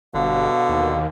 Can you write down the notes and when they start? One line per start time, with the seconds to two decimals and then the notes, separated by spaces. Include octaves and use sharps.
0.15 G1 B2 D3 F5
0.69 D#2